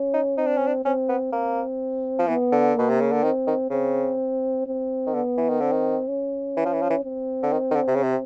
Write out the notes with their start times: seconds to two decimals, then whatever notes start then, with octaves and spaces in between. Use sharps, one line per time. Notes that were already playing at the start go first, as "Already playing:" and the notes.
Already playing: C#4
0.14 D#4
0.37 C4 D#4
0.47 D4
0.57 C#4
0.67 D4
0.85 C4 C#4
1.09 B3
1.33 A#3 C4
2.19 F3
2.28 E3 B3
2.52 D3
2.75 B2 A#3
2.89 C3
3.01 C#3
3.12 D3
3.23 D#3 C4
3.47 D#3
3.70 C#3 C4
4.66 C4
5.07 D#3
5.14 D3 B3
5.38 E3
5.49 D#3
5.61 D3 C4
5.72 D#3
6.09 C#4
6.57 E3
6.65 F3
6.73 E3
6.82 F3
6.90 E3
7.05 C4
7.43 D3
7.52 D#3
7.71 D#3
7.76 D3
7.88 C3
7.95 C#3
8.03 C3